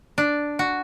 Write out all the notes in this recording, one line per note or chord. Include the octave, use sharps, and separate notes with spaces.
D4
F#4